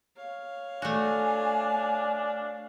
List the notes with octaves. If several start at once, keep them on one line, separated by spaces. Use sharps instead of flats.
C#5 F5
A3 D4 F#4 G#5